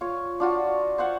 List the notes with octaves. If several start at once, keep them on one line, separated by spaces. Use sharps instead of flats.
F4 C#5
D4 F4 F#4
C5 F5 F#5 C#6